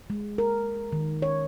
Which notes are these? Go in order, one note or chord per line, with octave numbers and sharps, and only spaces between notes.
G#3
A#4
D#3
C#5